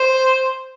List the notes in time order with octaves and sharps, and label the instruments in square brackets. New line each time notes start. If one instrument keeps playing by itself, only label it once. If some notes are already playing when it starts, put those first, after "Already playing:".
Already playing: [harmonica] C5